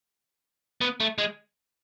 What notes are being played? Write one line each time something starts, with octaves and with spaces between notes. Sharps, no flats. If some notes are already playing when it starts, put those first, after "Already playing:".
B3
A3
G#3